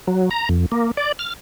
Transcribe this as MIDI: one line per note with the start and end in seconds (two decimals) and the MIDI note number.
0.07 0.29 54
0.31 0.49 82
0.49 0.66 41
0.72 0.91 58
0.97 1.12 74
1.19 1.33 89